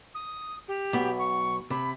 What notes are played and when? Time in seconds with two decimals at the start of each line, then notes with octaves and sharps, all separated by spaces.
0.14 D#6
0.67 G4
0.93 B1 B3
1.18 C#6
1.70 C3 B5